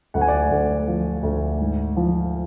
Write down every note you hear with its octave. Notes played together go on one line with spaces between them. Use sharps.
D2 F#5
G#5
D5 F#5
D2
F3
D2
G#2
F3